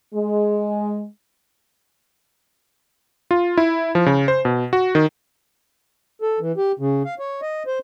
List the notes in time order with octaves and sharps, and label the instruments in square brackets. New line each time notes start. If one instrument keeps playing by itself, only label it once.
[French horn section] G#3
[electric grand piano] F4
E4
F3
C#3
C5
B2
F#4
D#3
[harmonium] A4
E3
G4
C#3
F5
C#5
D#5
C5